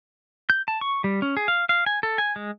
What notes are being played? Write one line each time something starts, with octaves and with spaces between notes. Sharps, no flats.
G6
A5
C#6
G3
C#4
G#4
F5
F5
G#5
A4
G#5
G#3